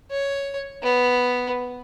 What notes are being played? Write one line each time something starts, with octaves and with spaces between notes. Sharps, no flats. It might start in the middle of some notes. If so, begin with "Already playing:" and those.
C#5
B3